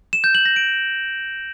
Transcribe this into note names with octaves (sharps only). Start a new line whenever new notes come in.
E7
G6
F#7
A#6
D7